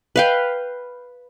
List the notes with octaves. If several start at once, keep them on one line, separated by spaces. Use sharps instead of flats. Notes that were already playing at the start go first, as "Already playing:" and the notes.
B4 F5 G5